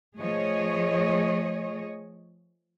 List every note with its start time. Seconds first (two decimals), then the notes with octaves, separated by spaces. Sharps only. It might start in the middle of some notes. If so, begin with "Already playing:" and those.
0.18 F3 A3 G#4 C#5 D#5